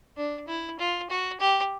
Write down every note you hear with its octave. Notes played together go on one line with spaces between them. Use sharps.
D4
E4
F4
F#4
G4